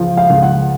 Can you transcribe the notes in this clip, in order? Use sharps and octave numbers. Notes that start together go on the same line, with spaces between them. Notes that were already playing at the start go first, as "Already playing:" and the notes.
Already playing: C#2 F3
F5
C#2
F#5